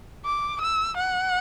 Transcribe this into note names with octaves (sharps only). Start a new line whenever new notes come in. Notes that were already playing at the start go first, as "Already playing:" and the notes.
D6
E6
F#5